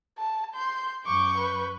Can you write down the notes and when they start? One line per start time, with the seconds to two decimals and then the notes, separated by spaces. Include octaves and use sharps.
0.18 A5
0.55 C6 G6
1.06 F#2 C#6 D6 G6
1.38 B4